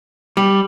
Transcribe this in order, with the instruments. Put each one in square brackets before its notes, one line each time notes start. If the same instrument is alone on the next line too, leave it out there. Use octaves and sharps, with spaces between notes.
[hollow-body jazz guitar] G3